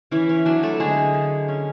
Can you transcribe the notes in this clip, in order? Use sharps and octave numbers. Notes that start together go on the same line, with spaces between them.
E3 C#4 E4
C#4
F#3 D4
A3 A4
D3 G#3 G#4
D3
C#4